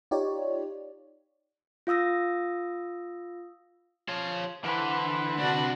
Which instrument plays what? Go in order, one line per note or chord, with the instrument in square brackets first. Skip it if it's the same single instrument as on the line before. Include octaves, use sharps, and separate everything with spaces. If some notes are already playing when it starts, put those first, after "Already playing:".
[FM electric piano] D#4 F4 G4 C#5 D5
[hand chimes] F4 F5 D#6 E6 A#6
[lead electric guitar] F3 [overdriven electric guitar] C#5 F5
[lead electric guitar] D3 [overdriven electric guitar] E3 [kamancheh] B4 C5
[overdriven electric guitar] C3 D4 [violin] F#4 D5